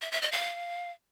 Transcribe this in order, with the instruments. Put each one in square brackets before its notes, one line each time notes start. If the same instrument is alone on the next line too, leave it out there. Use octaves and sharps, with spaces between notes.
[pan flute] E5
E5
D#5
F5